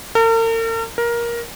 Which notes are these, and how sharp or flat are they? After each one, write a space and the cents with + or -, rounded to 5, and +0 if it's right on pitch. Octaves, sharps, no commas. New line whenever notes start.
A#4 -45
A#4 +15